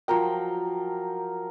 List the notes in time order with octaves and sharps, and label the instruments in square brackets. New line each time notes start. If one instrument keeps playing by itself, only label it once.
[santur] F3 F#3 A#4 G5